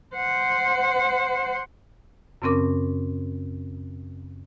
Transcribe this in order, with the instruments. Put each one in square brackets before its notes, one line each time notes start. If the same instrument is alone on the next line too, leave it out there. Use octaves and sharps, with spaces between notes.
[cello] C5 F#5
[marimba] F#2 C#3 C4 C#4 A#4 D6